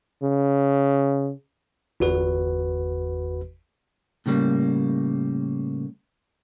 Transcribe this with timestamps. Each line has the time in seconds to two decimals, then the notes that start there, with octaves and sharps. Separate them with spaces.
0.23 C#3
2.00 G1 E2 F#4 B4
4.26 A2 C#3 G3 A#3